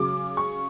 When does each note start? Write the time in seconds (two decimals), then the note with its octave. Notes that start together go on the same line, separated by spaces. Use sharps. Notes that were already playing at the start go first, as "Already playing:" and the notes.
Already playing: C#3 F#3 D6
0.37 C#6